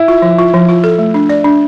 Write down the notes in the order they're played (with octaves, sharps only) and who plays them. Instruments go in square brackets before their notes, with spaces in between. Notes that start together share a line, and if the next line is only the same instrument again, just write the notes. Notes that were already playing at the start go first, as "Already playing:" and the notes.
Already playing: [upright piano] E4
[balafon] F4
F3
F4
F3
F4
A4
A3
D4
D5
D4